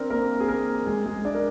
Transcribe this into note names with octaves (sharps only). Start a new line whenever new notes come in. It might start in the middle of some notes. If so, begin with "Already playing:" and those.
Already playing: C4 D4 A#4 D5
A#3 A#4
G#4
A#3 A#4
G#3 G#4
G#3 G#4
D4 D5
A#4